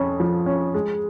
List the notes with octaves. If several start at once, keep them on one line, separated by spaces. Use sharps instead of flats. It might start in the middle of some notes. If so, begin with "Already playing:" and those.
Already playing: F2 C#4
F3
C#4
G#3